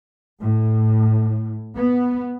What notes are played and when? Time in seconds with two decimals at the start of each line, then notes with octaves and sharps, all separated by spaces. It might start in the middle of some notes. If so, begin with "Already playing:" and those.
0.40 A2
1.75 B3